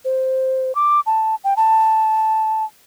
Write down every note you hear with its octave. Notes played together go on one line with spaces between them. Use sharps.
C5
D6
A5
G5
A5